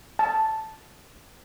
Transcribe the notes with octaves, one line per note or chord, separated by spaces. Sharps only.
A5